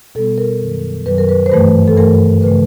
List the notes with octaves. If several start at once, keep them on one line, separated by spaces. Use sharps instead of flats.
B2 G3 B3 A4
A#4
F#2 D#3 F#3
F#2 D#3 F#3 B4
A#4
B4
C5
G2 E3 A3 B4
A4
G2 E3 A3 A#4
C#3 F3 A3 B4